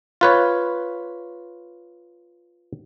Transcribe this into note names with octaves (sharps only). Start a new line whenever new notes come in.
F4 B4 C#5